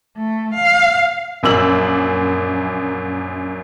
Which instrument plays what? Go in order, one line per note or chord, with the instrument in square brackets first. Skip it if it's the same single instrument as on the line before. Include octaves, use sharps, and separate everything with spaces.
[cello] A3
F5
[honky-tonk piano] A#1 F#2 A#3 E6 F#7